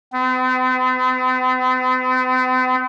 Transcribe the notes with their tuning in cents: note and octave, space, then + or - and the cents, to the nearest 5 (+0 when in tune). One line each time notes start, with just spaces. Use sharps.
C4 -45